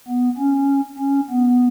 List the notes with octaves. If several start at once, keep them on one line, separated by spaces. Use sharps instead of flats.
B3
C#4
C#4
B3